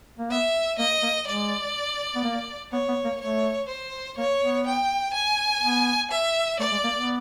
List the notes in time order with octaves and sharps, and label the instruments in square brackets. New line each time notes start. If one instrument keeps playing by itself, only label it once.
[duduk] A#3
[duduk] B3 [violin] E5
[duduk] A#3 [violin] D#5
[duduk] A#3
[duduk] G#3 [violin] D5
[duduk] B3
A#3
[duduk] B3 [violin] C#5
[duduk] B3
A#3
[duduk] A3 [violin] C#5
[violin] C5
[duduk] A#3 [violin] C#5
[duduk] B3
[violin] G5
G#5
[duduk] B3
[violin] E5
[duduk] A3 [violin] D5
[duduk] G#3
A#3
B3